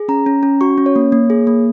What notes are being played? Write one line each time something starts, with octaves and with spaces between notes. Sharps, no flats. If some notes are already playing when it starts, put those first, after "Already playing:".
Already playing: G#4
C#4 A#5
C#4
C#4
F#4 C#6
C#4
C#5
A#3
A#3
G#4
A#3